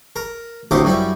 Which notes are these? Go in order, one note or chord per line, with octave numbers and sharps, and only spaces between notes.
A#4
D2 A2 C3 G4 D#5 D6
F#2 G3 E4